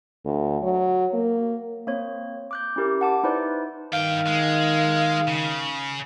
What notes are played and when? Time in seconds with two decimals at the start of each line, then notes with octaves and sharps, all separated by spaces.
0.25 D2
0.62 F#3
1.14 A#3
1.87 A#3 C4 C5 C#5
2.51 D6 F#6 G6
2.76 C#4 E4 G4 A#4
3.01 F#5 A5 D6
3.23 D#4 E4 B4 C5 D5
3.93 G2 D#3 F5 G5
4.27 G#3
5.27 C#3